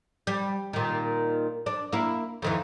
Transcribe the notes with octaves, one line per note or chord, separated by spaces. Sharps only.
G3
A#2 D#3
D4
A#3 E4
F2 D#3 E3